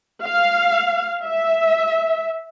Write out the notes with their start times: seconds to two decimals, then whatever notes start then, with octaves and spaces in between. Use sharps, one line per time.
0.24 F5
1.24 E5